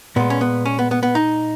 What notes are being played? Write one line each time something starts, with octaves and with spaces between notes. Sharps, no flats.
A#2 G#3 B3
C#4
B3
C#4
B3
B3
B3
D#4